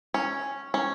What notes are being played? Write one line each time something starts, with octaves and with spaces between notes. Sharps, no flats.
C#4
C#4